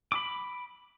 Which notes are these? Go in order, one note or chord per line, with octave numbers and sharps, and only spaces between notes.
B5 D6